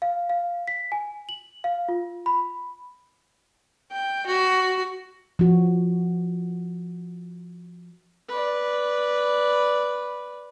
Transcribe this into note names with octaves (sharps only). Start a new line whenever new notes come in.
F5
F5
B6
G#5
F#7
F5
F4
B5
G5
F#4
F3 F#4
B4 D5